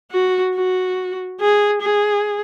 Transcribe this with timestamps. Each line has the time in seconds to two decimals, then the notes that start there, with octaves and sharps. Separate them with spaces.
0.12 F#4
0.55 F#4
1.40 G#4
1.82 G#4